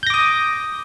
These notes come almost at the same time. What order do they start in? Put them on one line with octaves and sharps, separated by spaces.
G6 A#6 D6 D#6